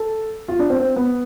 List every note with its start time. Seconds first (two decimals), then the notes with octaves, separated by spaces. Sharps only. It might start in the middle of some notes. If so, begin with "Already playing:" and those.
Already playing: A4
0.48 F4
0.59 D4
0.70 C4
0.80 C4
0.96 B3